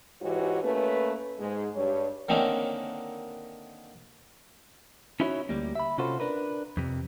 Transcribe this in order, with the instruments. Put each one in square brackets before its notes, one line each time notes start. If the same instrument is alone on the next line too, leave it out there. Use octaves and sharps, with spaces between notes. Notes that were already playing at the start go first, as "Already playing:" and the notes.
[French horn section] G#2 E3 D#4 F#4 G4 C#5
A3 A#3 C#4 B4
G#2 G#3
G2 C#5
[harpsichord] D3 D#3 A#3 C4 C#4 D#4
[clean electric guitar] C#4 D#4 E4 F#4 C5 C#5
D2 G3 A#3
E5 B5
C3 C#4 F4 F#4 A4 C5
D4 A#4 B4
F2 C3